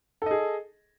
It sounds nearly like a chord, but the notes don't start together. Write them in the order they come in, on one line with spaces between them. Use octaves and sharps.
A4 D#5 G#4